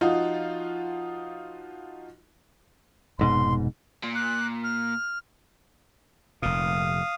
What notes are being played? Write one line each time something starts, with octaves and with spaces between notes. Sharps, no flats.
F3 D#4 F4 F#4
F1 G#2 B2 C6
A#2
F#6
F6
F1 A#2 F5 D#6